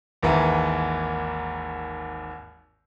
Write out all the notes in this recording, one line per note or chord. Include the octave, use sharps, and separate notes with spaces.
G#1 D#2 G#2 E3